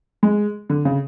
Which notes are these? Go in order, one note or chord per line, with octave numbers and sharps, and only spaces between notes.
G#3
D3
C#3